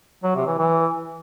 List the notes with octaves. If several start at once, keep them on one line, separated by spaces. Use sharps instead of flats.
F#3
C3
E3
E3